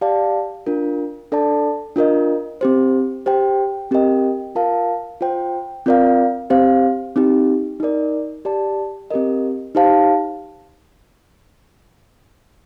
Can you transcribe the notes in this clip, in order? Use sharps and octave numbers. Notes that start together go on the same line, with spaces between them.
G4 D5 F5 A5
D4 F4 A#4
D4 A4 D5 A5
D4 F4 A#4 D#5
C4 G4 C5
G4 C5 G5
C4 G4 A#4 D#5 G5
F4 A#4 F5 A5
F4 C5 G5
C4 F4 A#4 D5 F5
C4 G4 C5 F5
C4 D#4 G4
D#4 A#4 D5
G4 D5 A5
C4 G4 A#4 D#5
D#4 G4 C5 F5 A5